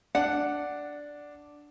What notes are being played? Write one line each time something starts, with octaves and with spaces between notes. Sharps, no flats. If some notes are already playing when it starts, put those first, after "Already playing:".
D4 F#5